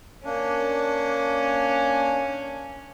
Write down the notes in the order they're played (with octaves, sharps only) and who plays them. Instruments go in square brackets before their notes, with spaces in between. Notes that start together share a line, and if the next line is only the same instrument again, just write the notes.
[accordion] A#3 D4 [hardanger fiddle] C#4